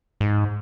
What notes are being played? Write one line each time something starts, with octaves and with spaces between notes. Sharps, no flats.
G#2